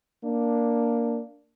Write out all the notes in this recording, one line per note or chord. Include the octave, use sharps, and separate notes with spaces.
A#3 D4